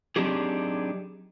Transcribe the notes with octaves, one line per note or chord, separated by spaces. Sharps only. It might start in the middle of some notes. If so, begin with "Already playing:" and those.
F#3 C4 D4 D#4 G4 G#4